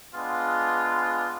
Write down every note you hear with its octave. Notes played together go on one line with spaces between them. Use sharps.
G#3 B3 D4 F4